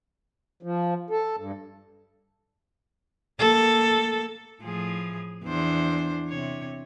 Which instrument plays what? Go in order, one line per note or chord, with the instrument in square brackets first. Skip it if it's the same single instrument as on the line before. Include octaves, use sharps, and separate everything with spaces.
[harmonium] F3
A4
G2
[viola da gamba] A#3 A4
A2 F3 G#4
E2 D4 C5
C3 C#5